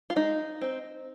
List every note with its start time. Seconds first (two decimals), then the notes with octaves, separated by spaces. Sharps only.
0.10 F4
0.16 G#3 D#4
0.61 C4 D#4